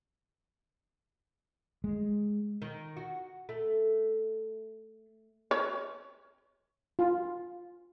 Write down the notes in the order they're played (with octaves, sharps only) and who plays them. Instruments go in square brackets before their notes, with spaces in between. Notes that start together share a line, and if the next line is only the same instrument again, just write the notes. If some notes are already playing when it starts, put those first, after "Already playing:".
[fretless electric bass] G#3
[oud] D#3
F#4
A3
[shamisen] C#5
[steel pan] F4